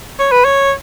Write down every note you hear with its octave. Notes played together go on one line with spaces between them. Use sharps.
C#5
B4
C#5